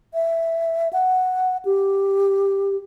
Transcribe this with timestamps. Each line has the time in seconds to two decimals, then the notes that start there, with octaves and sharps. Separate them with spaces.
0.14 E5
0.93 F#5
1.65 G4